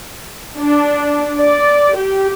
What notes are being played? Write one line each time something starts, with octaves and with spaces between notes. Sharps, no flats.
D4
D5
G4